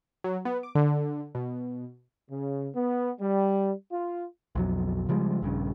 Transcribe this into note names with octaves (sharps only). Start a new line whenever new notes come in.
F#3
B3
D6
D3
B2
C#3
B3
G3
F4
B1 F2 F#3
C#3 F3 G3 G#3
A#1 G2 C#3